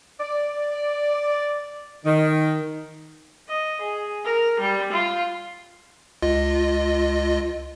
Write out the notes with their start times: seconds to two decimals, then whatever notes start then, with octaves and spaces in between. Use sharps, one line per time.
0.20 D5
2.04 D#3
3.49 D#5
3.81 G#4
4.25 A#4
4.60 G3
4.93 F4
6.22 C#2 F4 D#5